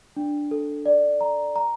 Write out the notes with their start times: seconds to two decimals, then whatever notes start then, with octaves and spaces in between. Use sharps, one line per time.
0.17 D4
0.51 A4
0.86 D5
1.21 A#5
1.56 A#5